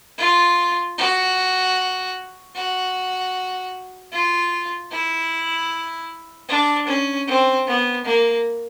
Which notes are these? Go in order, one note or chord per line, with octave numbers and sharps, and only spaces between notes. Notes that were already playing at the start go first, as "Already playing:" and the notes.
F4
F#4
F#4
F4
E4
D4
C#4
C4
B3
A#3